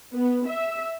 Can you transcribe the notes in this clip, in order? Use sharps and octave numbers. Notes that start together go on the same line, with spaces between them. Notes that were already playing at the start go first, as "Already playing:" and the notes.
B3
E5